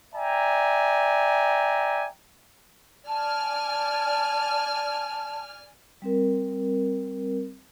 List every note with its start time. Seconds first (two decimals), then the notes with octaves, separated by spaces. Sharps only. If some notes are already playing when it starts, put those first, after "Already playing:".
0.15 D5 E5 G5 G#5 A#5
3.07 D5 G#5 A5 F6
6.02 G3 C4 A#4